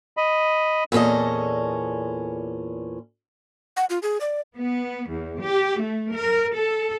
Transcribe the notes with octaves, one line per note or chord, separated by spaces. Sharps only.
D#5 B5
E2 A#2 C#4 A4 D#5
F#5
F4
G#4
D5
B3
E2
G4
A3
A#4
A4